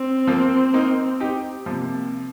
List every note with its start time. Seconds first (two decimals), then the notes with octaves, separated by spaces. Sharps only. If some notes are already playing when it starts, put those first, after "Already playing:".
Already playing: C4
0.27 F3 A#3
0.74 A#3 D#4
1.20 D#4 G4
1.66 C3 F3 A#3